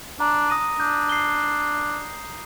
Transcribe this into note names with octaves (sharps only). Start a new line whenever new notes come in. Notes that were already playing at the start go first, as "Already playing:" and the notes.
D4 A#5
D#6 A#6 D#7
D4 G6
C7 G7